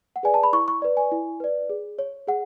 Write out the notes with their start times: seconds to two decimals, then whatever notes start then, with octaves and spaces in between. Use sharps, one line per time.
0.16 F#5
0.23 G#4 B4 D5 G#5
0.34 A5
0.43 B5
0.53 E4 C#6
0.68 C#6
0.82 B4 D5
0.97 G#5
1.12 E4
1.40 B4 D5
1.69 G#4
1.99 C#5
2.27 G#4 F#5